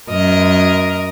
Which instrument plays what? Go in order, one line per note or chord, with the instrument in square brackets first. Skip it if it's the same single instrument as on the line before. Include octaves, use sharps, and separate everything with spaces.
[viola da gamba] F#2 A#4 D#5